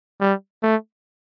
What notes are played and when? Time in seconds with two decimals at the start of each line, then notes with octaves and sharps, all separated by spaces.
0.20 G3
0.62 A3